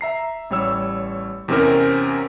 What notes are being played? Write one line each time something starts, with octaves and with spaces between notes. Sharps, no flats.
E5 A#5 C7
A1 G3 C#5 E6
E2 C3 C4 C#4 A#4